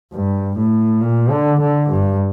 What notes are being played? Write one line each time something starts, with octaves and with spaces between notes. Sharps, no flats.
G2
A2
A#2
D3
D3
G2